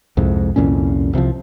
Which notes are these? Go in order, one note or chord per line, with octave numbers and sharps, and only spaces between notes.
C2 F2 G#2
C2 F2 A#2 C#4
C2 C3 E3 F3